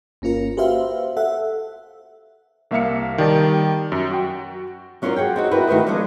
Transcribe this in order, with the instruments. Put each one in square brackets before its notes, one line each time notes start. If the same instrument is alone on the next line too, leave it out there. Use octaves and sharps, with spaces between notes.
[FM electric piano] G1 A#3 C#4 F4 A#4
F#4 G4 B4 C5 E5 F5
A4 E5 F#5
[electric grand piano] C2 A#3 E5 F5 C#7
D#3 G3 G4 D5 A5
F#2
F#4 G5
[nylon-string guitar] F#3 C#4 F4 A4 A#4 D5
F#4 G#4 F#5 G5
C4 D#4 F#4
E4 F#4 G4 A#4 B4
D#3 A3 F#4 B4 C5
F3 G#3 A#3 B3 C#4 D4